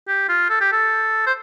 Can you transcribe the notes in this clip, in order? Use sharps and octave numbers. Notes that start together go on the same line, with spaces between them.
G4
F4
A4
G4
A4
C5